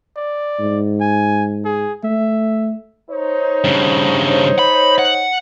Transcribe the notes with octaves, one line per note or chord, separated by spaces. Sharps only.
D5
G#2
G#5
G#4
A3 E5
D#4 C5 C#5
G2 C#3
B5
F#5